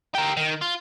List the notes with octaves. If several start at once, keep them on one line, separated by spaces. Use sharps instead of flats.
G4 A#4
D#3
F4